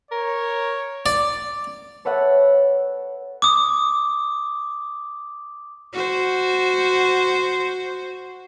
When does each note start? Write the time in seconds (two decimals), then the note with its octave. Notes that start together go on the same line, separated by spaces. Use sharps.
0.11 A#4 C#5
1.06 D5
2.05 A4 B4 C#5 E5 F#5
3.42 D6 D#6
5.93 F#4 C5